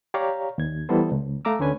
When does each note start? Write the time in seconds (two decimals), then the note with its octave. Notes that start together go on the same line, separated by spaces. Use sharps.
0.14 G4 C#5 D5 F5 A#5
0.58 D#2 G#6
0.89 E3 G3 B3 E4 A4 C5
1.12 C#2
1.45 A3 F5 A#5 D6 E6
1.59 D2 D3 C#4 B4 G#5